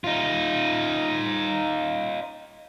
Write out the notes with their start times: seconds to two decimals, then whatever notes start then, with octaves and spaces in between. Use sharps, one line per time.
0.04 D#4 F4